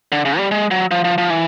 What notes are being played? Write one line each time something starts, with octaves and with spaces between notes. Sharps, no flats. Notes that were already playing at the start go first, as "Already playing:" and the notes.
D3
C#3
G3
G#3
F#3
F3
F3
F3
E3